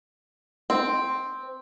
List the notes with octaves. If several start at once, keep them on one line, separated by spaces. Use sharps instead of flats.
C4